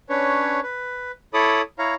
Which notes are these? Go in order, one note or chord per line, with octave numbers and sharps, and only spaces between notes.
C#4 D4 B4 C#5
B4
E4 A4 C#5 B5 D6 D#6
E4 C#5 F5 A#5